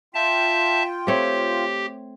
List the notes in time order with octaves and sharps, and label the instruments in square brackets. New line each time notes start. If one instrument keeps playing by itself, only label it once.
[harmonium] F4 G5 [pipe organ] E5 A5
[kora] A3 C4 C#5 [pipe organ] G4